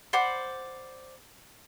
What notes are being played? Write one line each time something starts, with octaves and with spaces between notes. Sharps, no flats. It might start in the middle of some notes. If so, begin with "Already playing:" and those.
C5 D5 F#5 B5